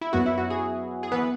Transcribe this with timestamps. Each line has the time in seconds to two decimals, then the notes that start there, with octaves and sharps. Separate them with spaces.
0.01 E4
0.13 F#2 F#3 B3 F#4
0.26 E4
0.38 F#4
0.50 G#4
1.03 G#4
1.12 E3 B3 B4